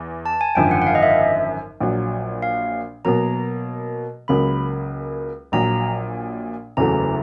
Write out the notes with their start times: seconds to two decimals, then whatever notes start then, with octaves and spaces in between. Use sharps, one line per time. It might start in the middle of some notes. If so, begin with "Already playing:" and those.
Already playing: E2
0.26 A5
0.41 G#5
0.55 G#1 F#2 D3 F3 G5
0.71 F#5
0.82 F#5
0.87 F5
0.95 D#5
1.03 E5
1.80 A#1 A#2 F#3
2.43 F5
3.05 B2 F#3 A#3 A#5
4.28 C#2 C#3 F#3 A#3 B5
5.52 A#1 A#2 F#3 A#5
6.77 F#1 E2 C#3 F#3 A3 A#5